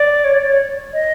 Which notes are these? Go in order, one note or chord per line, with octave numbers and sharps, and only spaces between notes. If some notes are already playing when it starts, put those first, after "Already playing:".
Already playing: D5
C#5
D5
C#5
D#5